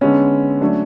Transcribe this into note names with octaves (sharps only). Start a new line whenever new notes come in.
D3 G#3 B3 C#4
F#3 A3 C#4 D4